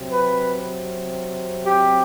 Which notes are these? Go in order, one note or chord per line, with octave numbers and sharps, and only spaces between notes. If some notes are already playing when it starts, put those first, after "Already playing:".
Already playing: C3 F#3 C4
B4
G4